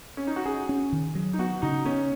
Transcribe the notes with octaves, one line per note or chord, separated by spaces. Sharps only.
C#4
D#4
F#4
C#4 G#4
C#4
D#3
F#3
D#4
B3 F#4
C#3 D#4
B3 C#4